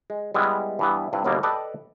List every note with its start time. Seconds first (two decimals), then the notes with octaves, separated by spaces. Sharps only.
0.10 G#3
0.34 G3 G#3 B3 E4
0.79 G2 E3 B3
1.13 G2 C3 E4 F4 B4
1.24 G1 D#2 B2 A#3 D5
1.43 A4 B4 D5 D#5 G5 A5